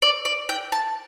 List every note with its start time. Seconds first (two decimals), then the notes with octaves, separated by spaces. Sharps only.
0.02 D5
0.25 D5
0.49 G5
0.72 A5